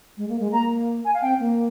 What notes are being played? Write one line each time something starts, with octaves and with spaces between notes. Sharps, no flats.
G#3
A#3
G#3
A#3 A#5
G#5
F5
C4 G5
A#3